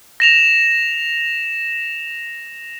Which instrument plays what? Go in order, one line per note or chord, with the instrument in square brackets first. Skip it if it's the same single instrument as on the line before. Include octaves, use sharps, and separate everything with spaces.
[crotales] A#6 E7 F7